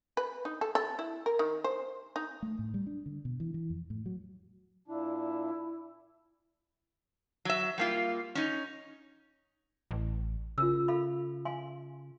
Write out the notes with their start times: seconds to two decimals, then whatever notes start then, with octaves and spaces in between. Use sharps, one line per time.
0.17 B4
0.45 D#4
0.61 A4
0.75 A4
0.99 E4
1.26 A#4
1.39 D#3
1.64 C5
2.16 D#4
2.42 A3
2.59 A2
2.74 G3
2.87 D4
3.06 D3
3.25 B2
3.40 E3
3.54 E3
3.70 F2
3.90 A2
4.06 F#3
4.88 A#2 D4 E4
7.45 F#3 E5
7.78 G3 A#3 F4
8.35 C#4 D#4
9.91 A1
10.58 C#3 F4 A#4 E6
10.88 A4 F5 B5
11.45 F5 G#5 C6